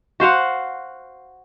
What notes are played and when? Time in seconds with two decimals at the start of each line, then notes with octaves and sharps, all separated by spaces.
0.20 F#4 C5 F5 F#5